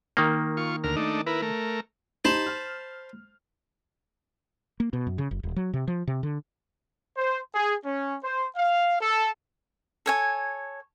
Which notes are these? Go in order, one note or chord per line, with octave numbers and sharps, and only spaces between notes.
D#3 A#3
F4 C#6
D2 A#4 F6
A3 D4 D#4
E4 A#4 B4
A3 A#4
D#4 G4 C5 A5 B5
F6
A#3
B2
F#2
C#3
F#1
D#1
F#3
C3
F3
C3
D3
C5
G#4
C#4
C5
F5
A4
A4 C#5 G#5